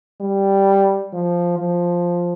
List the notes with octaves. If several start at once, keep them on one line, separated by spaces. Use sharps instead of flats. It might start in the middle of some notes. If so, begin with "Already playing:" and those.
G3
F3
F3